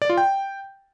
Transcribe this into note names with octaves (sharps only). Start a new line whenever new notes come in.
D5
F4
G5